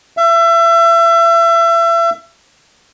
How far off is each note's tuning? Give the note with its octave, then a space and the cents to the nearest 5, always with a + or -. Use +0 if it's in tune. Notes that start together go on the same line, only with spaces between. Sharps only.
E5 +30